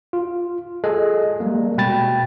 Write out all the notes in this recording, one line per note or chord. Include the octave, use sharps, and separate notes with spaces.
F4
G#4 A4 D#5
G3 G#3 A#3
B2 G5 B5 A6